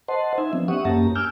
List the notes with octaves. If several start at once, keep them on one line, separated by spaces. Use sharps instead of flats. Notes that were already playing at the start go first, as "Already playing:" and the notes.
C5 D#5 F#5 A5 C6
D#4 E5 G#5
F3 B3 C4 D4
G4 E5 F#5 C#6 D#6
F#2 A#3 C#4 G4 A5 A#5
G#5 D6 E6 F6 G6